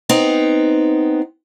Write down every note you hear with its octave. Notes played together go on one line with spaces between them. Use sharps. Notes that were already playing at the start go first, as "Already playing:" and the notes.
B3 C4 D#4